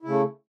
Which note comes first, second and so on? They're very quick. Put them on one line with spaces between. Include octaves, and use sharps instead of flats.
E4 C#3 A3